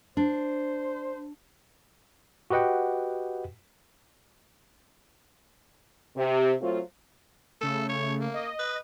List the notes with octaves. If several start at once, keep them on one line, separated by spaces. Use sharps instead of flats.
D4 C5
F#4 G4 B4 D#5 F#5 G5
C3
F#3 A3 C4 F4
C#3 A3 A4
C#5
A#3
D#5
B4